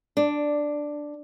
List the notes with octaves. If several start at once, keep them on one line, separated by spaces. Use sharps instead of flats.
D4